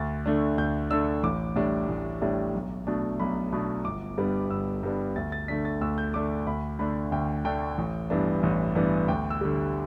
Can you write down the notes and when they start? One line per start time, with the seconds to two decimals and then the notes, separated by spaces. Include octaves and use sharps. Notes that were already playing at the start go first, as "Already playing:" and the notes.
Already playing: D2 A6
0.26 D3 A3 D4
0.58 D2 G6
0.90 D3 A3 D4 E6
1.23 A1 D6
1.56 A2 G3 D4
1.89 A1
2.22 A2 G3 D4
2.54 B1
2.87 B2 A3 D4
3.19 B1 B5
3.52 B2 A3 D4 B5
3.85 G1 D6
4.18 G2 G3 B3 D4
4.51 G1 E6
4.83 G2 G3 B3 D4
5.16 D2 A6
5.32 A6
5.48 D3 A3 D4 B6
5.65 A6
5.81 D2 E6
5.98 G6
6.14 D3 A3 D4 D6
6.47 D2 B5
6.79 D3 A3 D4 B5
7.12 D2 G5
7.45 D3 A3 D4 G5
7.78 A1
8.10 G2 E3 B3 D4
8.43 A1
8.75 G2 E3 B3 D4
9.08 D2 G5
9.30 E6
9.41 D3 G3